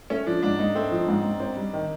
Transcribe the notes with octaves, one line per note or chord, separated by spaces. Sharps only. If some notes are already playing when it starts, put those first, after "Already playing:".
A3 C#4
F3 D4
G#2 D4
G#2 D#4
A3 C4
F3
G#2
G#2
C4
G3
D#3